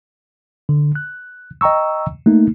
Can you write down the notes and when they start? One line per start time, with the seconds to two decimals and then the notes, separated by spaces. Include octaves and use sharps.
0.69 D3
0.95 F#6
1.61 D#5 G5 A#5 C#6 E6
2.26 A3 A#3 D#4